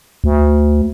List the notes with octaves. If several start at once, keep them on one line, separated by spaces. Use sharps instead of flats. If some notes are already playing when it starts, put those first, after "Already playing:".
D2